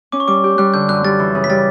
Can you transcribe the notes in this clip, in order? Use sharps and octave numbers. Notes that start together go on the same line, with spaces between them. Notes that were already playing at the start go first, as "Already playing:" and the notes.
C#4 D6
C#6
G3 D6
G4
G3 F#6
D3 G6
F#2 F#6
G3 A6
E3
C#3
B6
G3 A6